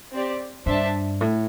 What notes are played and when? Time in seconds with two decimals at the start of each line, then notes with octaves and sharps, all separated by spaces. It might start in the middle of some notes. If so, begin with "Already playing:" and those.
0.12 C4 G4 D5
0.66 G2 D4 C5 E5 A5
1.21 A2